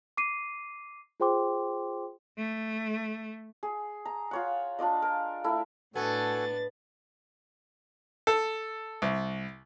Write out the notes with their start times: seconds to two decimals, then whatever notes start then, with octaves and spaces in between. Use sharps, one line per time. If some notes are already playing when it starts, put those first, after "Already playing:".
0.17 D6 C7 D#7
1.20 F4 G#4 C5 G5 C6 D6
2.38 A3
3.63 G#4
4.05 A#5
4.31 F4 C#5 F#5
4.79 D4 F4 D5 D#5
5.02 A#4
5.44 A3 E4 A#4
5.95 A2 B3 D4 F#4 A4 G#5 A6
8.27 A4
9.02 C2